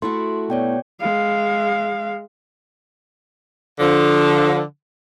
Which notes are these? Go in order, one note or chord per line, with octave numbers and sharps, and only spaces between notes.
A3 E4 F#4 C6
B2 C#5 D5 G5
G#3 F5
D3 F3